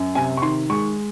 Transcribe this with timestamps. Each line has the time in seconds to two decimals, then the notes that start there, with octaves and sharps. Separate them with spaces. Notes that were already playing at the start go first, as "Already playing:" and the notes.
Already playing: F#2
0.15 C3 G#5
0.37 C#6
0.42 D#3 C6
0.70 G#3 C#6